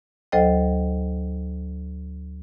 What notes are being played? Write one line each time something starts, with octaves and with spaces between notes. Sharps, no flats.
D2 F#3 A4 C5 D#5 G5